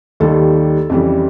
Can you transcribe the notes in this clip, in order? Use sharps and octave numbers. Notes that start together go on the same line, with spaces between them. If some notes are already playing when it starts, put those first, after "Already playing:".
D#2 D#3 G3 A4
F2 C#3 E3 G3